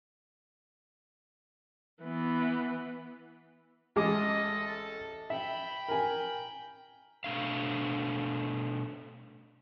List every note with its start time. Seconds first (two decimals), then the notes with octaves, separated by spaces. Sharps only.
2.03 E3 B3
3.96 A1 G#3 A4 D#5 D6
4.66 A4
5.30 E5 G5 B5
5.88 A#4 G#5
7.24 B2 A3 D4 F5